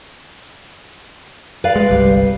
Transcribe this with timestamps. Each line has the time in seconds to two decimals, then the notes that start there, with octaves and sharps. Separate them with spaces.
1.64 B4 D5 F5
1.76 G#3
1.89 G1 C2 G3